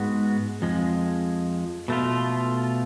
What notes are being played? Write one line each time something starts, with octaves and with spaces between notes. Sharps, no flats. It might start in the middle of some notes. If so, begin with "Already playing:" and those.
Already playing: G#2 G#3 B3 F#4
F2 F3 G#3
B2 A3 F4